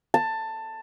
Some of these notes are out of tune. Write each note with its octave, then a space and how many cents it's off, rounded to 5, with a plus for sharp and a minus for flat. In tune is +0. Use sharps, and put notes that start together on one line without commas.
A5 +15